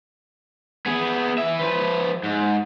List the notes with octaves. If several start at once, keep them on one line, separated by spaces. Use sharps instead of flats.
B3 G#4
E3 E5
F3 B4
G#2